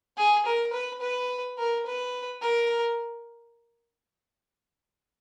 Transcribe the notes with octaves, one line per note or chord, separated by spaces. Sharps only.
G#4
A#4
B4
B4
A#4
B4
A#4